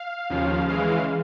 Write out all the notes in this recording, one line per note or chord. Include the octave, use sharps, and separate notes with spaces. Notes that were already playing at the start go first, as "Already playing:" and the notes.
Already playing: F5
D#2 C#3 F3
C#3 E3 G#3 F5